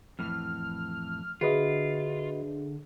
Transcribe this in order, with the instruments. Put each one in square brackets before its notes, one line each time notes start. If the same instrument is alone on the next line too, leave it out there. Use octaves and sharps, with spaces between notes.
[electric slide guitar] F2 A2 E3 [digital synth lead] F6
[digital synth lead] D3 [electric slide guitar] F4 [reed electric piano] F#4 B4 D#5 [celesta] G#4 E5